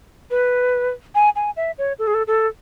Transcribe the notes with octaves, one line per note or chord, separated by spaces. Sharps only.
B4
G#5
G#5
E5
C#5
A4
G#4
A4
A4